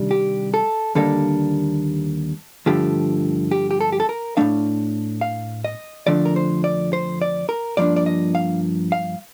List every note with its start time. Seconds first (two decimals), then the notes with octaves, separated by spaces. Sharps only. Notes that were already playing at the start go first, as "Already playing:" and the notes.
Already playing: C3 D#3 G3 D4
0.11 G4
0.54 A4
0.95 D#2 D3 G3 A#3 D4 A4
2.66 G2 D3 F3 A3 G4
3.51 G4
3.71 G4
3.81 A4
3.92 G4
4.00 A4
4.09 A#4
4.37 A2 A3 D4 F5
5.21 F5
5.64 D#5
6.07 F2 D3 F3 A3 D4 D5
6.25 A#4
6.36 C5
6.64 D5
6.93 C5
7.22 D5
7.49 A#4
7.77 G2 F3 A#3 D4 D5
7.96 D5
8.06 D#5
8.35 F5
8.92 F5